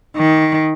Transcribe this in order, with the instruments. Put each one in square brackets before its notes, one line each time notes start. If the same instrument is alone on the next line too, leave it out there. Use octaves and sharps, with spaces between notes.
[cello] D#3